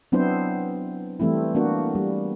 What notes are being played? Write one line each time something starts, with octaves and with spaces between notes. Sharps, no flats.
F#3 B3 C4 D4 E4 C5
E3 G3 A3 C4 E4
A#3 B3 D4 F#4
G3